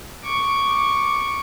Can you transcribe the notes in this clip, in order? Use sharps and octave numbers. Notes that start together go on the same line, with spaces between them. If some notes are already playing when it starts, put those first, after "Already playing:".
C#6 D6